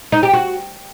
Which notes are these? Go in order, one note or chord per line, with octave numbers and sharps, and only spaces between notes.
D#4
G4
F#4